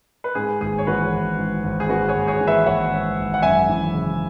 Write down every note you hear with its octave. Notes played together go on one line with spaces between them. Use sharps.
B4
G#2 G#4
G#1 G#4
C#5
E3 F#4 B4
G#1
G#2
G#1
G#4
G#2 F#4 B4
G#4 C#5
G#1
G#4 C#5
E3
B4 E5
G#1 C#5 F#5
G#2
G#1
F#5
F#2 E5 G#5
E3
C#3